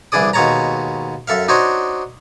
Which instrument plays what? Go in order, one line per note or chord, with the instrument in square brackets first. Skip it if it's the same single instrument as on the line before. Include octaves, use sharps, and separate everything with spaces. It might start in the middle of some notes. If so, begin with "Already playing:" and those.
[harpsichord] C2 E3 D4 G#4 D5 D#6
D#2 B2 G#3 C#5 A5 A#5
F#2 A4 E5 F5
D4 D#4 F#4 C5 C#5 D#5